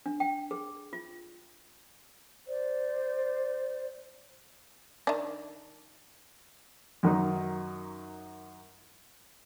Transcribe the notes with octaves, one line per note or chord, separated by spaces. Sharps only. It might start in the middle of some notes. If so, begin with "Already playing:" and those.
D4
G5
G#4
F4
C5 D5
D#3 D4
F#2 D#3 F#3 D#4